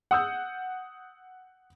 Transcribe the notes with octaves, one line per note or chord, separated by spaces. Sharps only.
F#5 D#6 E6 G6